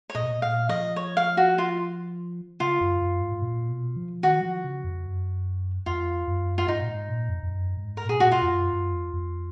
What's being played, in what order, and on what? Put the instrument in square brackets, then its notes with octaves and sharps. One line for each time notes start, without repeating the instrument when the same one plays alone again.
[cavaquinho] C#5
[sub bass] A#2 [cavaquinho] D#5
[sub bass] B2
A#2
B2
[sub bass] A#2 [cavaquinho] F5
[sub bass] F3 [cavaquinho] D#5
[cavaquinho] C#5
F5
F#4
F4
[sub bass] C#3 [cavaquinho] F4
[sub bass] F#2
F#2
G#2
G#2
A#2
B2
F3
[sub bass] D#3 [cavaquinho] F#4
[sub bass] F#3
F3
C#3
F2
F#2
[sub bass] F2 [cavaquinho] F4
[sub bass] F#2
[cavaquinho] F4
[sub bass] G#2 [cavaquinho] D#4
[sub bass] A#2
G#2
A#2
F2
F2
F#2
G#2
[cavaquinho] A#4
[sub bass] A#2
[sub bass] B2 [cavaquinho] G#4
[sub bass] A#2 [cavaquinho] F#4
[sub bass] B2 [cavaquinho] F4
[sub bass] F2
F#2
F#2
F2
F2